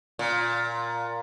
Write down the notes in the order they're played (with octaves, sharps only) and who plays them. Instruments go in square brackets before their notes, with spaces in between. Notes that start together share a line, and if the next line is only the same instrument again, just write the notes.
[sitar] A#2